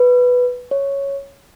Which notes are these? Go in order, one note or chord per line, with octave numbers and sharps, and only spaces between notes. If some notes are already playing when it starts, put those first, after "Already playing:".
Already playing: B4
C#5